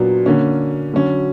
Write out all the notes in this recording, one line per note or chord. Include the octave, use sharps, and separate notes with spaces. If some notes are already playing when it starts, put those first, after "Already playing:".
Already playing: A#2 F#3 B3 D4
D3 A#3 C#4
D3 F#3 C#4